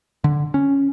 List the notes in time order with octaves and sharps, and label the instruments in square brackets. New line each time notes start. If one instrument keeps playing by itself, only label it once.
[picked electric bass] D3
C#4